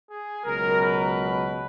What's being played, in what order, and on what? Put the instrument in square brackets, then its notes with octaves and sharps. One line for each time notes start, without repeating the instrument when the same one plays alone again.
[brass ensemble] G#4
C#2 B2 F#3 A#4
B4